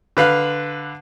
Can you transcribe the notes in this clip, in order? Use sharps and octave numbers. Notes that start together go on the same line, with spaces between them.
D3 B4 F5 F#6